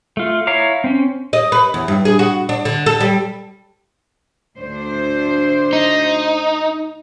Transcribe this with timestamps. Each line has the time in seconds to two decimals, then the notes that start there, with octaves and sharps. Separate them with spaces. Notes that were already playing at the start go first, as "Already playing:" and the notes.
0.17 A3 F4
0.47 E4 C#5 F5 A#5 D6
0.84 C4 C#4
1.33 D#5
1.52 B4
1.74 E2
1.88 G2
2.05 G#4
2.19 F#4
2.49 D4
2.65 D3
2.86 A4
3.00 G3
4.59 D2 D4 C5
5.73 D#4